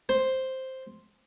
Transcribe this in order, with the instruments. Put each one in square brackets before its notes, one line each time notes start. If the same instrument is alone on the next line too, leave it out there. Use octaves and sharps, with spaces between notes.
[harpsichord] C5